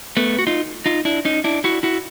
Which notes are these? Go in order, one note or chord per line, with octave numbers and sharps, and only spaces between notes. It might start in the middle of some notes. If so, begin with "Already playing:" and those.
A3 B3
F#4
D#4 F4
D#4 F4
D4 E4
C#4 D#4
D4 E4
E4 F#4
E4 F#4